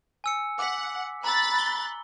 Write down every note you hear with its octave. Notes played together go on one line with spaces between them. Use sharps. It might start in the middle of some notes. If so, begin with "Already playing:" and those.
G#5 E6 C#7
F#5 D6 B6
A#5 B5 E6 F#6 A6
G7